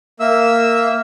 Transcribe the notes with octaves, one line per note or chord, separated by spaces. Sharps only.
A#3 E5 E6